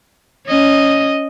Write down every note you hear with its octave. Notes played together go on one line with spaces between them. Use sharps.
C#4 D#5